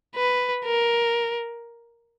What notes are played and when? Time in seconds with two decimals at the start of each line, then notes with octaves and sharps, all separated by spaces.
0.16 B4
0.65 A#4